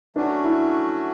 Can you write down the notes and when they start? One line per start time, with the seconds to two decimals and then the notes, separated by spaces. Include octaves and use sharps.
0.16 F#3 A3 C#4 D4 F#4
0.44 E4